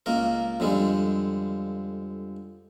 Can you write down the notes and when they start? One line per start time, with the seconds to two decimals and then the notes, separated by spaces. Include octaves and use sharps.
0.06 C#2 A#3 A#4
0.60 F2 D3 G3 G#3